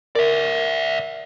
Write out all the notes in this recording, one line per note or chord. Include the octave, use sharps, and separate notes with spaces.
A#4 D5 E5